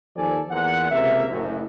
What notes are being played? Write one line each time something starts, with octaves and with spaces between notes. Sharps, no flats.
D#2 F3 A4 D5 G#5
E2 A#2 F#5
C#2 C3 A#3 E5
F#1 F#2 A2